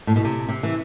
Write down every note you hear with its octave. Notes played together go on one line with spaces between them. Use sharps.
A2
B2
C3
C3
E3